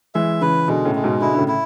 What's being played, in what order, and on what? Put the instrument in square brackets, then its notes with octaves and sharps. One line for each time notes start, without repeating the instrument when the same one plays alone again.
[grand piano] E3 G#3 [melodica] E5
[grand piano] C#3 E3 [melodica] B4
[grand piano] B2 D3 [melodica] G#3
[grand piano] A2 C#3
[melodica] G#3
[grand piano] G#2 B2
[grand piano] B2 D3 [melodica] E4
[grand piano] D3
A2 C#3
[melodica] E4